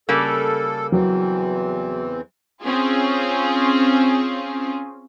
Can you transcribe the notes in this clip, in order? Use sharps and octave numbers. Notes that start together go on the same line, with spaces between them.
C#3 G3 A#3 A4
E2 E3 F#3 C4
C4 C#4 F4 G#4